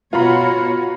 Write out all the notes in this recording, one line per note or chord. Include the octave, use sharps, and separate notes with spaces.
B2 F4 F#4 C#5 A#5 B5